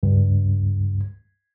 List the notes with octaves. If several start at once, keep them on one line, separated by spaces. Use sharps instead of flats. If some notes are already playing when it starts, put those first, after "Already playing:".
C#2 G2